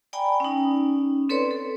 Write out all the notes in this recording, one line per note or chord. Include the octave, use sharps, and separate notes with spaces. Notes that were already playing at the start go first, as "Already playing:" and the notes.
D5 G5 G#5 A#5 B5
C#4 D#4
C4 A4 B4 C#5 D5 C6
A4